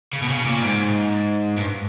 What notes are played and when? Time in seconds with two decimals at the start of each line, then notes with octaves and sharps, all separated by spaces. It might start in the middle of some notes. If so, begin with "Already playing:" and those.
0.13 C#3
0.22 B2
0.29 C#3
0.45 A#2
0.62 G#2
1.57 G2